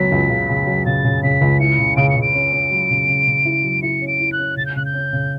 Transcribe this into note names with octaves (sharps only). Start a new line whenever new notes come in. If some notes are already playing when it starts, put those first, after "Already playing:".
Already playing: C#2 F#3 B3 B6
C#2
C#3
C#3
F#3
C#3 A6
C#3
C#3 B6
C#2
E4 C#7
C#3
C#3 D7
C#7
C#3
D7
C#4
C#4
F#3
C#3
C#3
C#3
E4
F#3
E4 C#7
C#4
D7
E4
F#6
C#4
C#3 A6
G6
C#3 F#6
G6
C#4
C#3